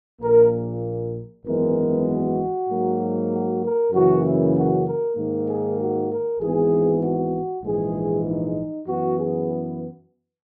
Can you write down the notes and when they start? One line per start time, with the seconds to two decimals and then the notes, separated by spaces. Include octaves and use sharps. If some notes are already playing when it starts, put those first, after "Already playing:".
0.21 A#1 A#2 A#3 A#4
1.45 G#1 F#2 E3 G#3 B3 A#4
2.07 F#4
2.68 G#2 F#3 A#3
3.30 F#4
3.62 A#4
3.92 F#2 C#3 E3 A#3 F#4
4.24 E4
4.55 F#4
4.85 A#4
5.16 G#2 D#3 A#3
5.47 G#4
5.79 F#4
6.10 A#4
6.39 G#1 G#2 E3 B3 G#4
7.02 F#4
7.63 A#1 G#2 E3 G#3 G#4
8.25 D#4
8.87 F#2 E3 B3 F#4
9.19 G#4